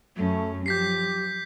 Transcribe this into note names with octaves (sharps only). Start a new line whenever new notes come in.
F#2 F#3 A3 C#4
F3 G4 G6 B6 C7